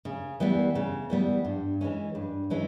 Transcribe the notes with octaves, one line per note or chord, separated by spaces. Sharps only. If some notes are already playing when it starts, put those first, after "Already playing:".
C#3
E3 G3 B3
C#3
E3 G3 B3
G2
E3 G#3 C#4
G2
E3 G#3 C#4